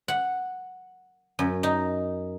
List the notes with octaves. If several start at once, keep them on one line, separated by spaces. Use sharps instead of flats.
F#5
F#2
D#4